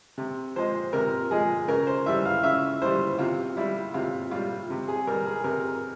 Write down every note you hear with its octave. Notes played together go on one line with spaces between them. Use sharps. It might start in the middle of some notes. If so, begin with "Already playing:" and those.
C3
F3 G#3 C5
C3 A#4
F3 G#3 G#4
C#3 A#4
C5
E3 G3 E5
F5
C#3 E5
E3 G3 C5
C3 F4
G3 E4
C3 F4
G3 F4
C3
G#4
G3 A#4
G#4
C3 A#4